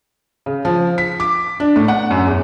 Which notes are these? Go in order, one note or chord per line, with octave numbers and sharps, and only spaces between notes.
C#3
F3
B6
D6
D4
A2
F#5
F#2
E2